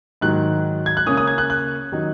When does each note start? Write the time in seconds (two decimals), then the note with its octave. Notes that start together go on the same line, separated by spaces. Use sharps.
0.21 G#2 D#3 F#3 F#6
0.86 G#6
0.97 F#6
1.06 C#3 A#3 C#4 D#6
1.17 D#6
1.27 G#6
1.38 F#6
1.50 F#6
1.92 D#3 F#3 D#4